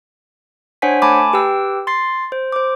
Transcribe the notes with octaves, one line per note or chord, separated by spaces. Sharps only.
D4 C5 C#5 F#5 G#5 B6
A3 G#5 A5 B5 D6
G4 B4 G5 E6
C6 A6 C7
C5
C5 D6